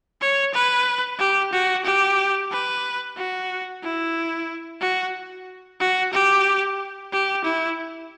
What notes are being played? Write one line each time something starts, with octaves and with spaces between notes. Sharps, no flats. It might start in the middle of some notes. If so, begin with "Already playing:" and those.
C#5
B4
G4
F#4
G4
B4
F#4
E4
F#4
F#4
G4
G4
E4